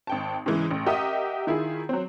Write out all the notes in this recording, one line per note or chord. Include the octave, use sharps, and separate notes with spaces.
G#1 G5 A5
G#2 C#3 E3 G#3
A1
G4 A#4 D#5 E5 F#5 D#6
D#3 E4 F4 G#4
F#3 C4